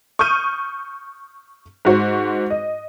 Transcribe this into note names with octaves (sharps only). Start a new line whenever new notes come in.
C#6 D#6 F6 G6 D#7
G#2 F#4 C5
D#5